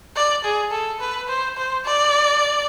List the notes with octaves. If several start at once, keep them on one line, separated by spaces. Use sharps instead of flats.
D5
G#4
A4
B4
C5
C5
D5